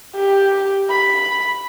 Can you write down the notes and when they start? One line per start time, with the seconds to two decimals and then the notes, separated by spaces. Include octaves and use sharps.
0.16 G4
0.90 B5